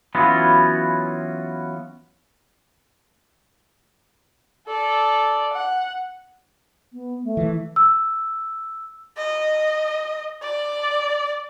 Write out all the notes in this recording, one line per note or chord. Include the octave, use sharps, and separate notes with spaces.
E3 F#3 B3 C#4 F4 F#4
A4 D5
F#5
B3
A3
E3
E6
D#5
D5